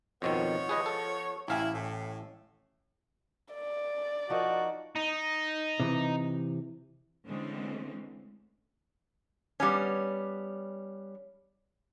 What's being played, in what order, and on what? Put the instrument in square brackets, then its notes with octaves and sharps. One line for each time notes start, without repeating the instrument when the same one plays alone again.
[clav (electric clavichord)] F2 B2 D#3 [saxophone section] F3 B3 C#5
[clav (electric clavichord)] G#4 B4 D#5
A4
[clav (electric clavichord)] A1 F5 G#5 [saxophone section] E4
[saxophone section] A2
[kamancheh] D5
[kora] F3 D#4 A#4 [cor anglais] F#4
[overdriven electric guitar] D#4
[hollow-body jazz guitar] C3 E3
[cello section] D3 E3 G#3 A3 C4 C#4
[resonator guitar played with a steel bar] G3 B3 C#4